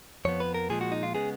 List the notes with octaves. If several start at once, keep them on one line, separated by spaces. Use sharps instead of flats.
F2 F3 B3 C#5
B4
A#4
A#2 F3 G#3 G#4
F#4
D#4
F4
C#3 G#3 B3 G#4